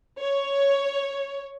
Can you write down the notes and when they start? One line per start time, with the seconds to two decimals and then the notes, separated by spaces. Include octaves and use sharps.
0.21 C#5